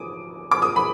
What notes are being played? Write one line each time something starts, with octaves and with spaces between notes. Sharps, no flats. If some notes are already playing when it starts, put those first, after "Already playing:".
Already playing: D6 D#6
D6
D#6
B5